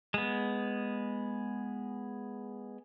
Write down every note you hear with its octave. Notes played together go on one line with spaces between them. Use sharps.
G#3 B3